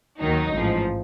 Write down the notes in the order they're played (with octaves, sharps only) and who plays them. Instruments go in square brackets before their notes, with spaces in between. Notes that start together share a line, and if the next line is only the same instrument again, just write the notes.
[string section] D#2 D#3 F#3 D#4
A1 G#2 F3